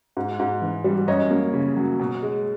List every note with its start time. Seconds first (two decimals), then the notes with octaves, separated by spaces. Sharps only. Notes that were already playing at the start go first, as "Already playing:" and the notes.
0.17 G#2
0.40 G#2
0.62 E3
0.84 G3
1.07 F#2 C#5 D#5
1.31 A#3
1.54 C#3
1.76 F#3
2.00 B2
2.22 G#3